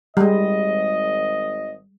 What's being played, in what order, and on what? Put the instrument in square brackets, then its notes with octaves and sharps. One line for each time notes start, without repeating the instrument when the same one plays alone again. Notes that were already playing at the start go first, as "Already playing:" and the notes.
[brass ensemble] G#1 D#5 [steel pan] G3 G#3